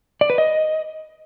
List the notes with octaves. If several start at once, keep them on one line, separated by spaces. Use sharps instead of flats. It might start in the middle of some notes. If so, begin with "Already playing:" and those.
D5
B4
D#5